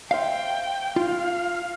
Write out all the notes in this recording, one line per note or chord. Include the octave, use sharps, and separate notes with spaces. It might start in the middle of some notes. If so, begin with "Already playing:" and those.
C5 E5 F5 G5
F4 F5